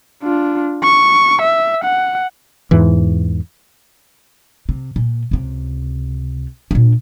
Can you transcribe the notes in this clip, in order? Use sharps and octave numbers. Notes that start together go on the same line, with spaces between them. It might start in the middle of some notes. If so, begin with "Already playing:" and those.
D4 F4
C#6
E5
F#5
E2 G#2 E3
C3
A#2
C#2 C3
A#2 D4